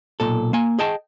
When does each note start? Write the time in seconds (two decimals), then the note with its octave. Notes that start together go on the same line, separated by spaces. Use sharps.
0.20 B1 A#2 A4
0.53 A#3 G#5
0.79 G#4 D#5 G5 A5